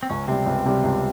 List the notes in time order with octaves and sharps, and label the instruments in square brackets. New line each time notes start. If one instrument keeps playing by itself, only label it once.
[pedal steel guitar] C4
[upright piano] C#2 [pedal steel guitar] C#4
[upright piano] C3 G3 [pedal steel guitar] C4
[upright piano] C#2
C3 G3
C#2